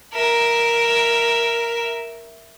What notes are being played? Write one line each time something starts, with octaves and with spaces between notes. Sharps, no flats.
A#4 E5